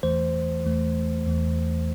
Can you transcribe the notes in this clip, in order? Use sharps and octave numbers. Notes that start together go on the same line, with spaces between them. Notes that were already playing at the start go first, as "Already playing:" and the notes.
E2 E3 A3 C5
E2 E3 A3
E2 E3 A3